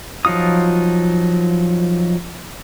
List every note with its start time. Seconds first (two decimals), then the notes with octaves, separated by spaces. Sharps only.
0.25 F3 F#3 D#4 F4 D#6